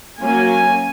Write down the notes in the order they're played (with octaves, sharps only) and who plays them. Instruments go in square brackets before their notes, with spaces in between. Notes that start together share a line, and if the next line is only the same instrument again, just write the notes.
[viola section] F#3 A#3 C#4 G#5